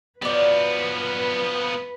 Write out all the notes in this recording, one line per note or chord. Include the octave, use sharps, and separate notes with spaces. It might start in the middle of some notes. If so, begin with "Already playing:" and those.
F3 F#3 B3 B4 D5